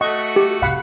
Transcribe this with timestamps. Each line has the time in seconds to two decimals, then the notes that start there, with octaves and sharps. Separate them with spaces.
0.01 A3 F#4 D#5 F#5 C#6
0.36 G4
0.62 F2 C3 F5 F#5 B5